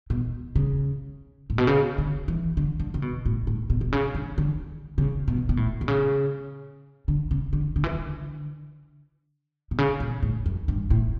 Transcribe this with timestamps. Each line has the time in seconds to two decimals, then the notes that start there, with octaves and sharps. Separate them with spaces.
0.10 B2
0.56 C#3
1.50 A2
1.58 B2
1.67 C#3
1.98 D3
2.28 E3
2.57 D3
2.80 D3
2.94 C#3
3.02 B2
3.26 A2
3.47 A2
3.70 B2
3.81 B2
3.92 C#3
4.15 D3
4.38 D3
4.98 C#3
5.28 B2
5.49 B2
5.57 A2
5.81 B2
5.88 C#3
7.08 D3
7.31 C#3
7.53 D3
7.76 D3
7.84 E3
7.92 D3
9.71 B2
9.78 C#3
10.00 B2
10.23 A2
10.46 F#2
10.68 G2
10.90 A2